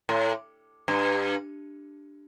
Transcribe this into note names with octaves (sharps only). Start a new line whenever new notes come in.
A2
G2